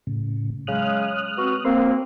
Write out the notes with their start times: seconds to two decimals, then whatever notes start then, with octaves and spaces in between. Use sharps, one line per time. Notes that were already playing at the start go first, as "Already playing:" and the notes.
0.07 A2 C#3
0.67 C#3 F#3 G#3 D#6 F6 F#6
1.38 B3 C4 F#4
1.65 A#3 C4 A#4 C5 C6